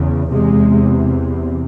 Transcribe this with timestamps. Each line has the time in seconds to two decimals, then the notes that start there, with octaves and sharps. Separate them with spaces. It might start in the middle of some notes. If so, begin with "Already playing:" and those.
Already playing: E2 C#3
0.31 E2 C3 G#3